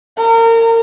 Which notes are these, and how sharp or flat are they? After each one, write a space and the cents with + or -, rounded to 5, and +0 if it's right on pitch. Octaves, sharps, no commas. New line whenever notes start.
A#4 -30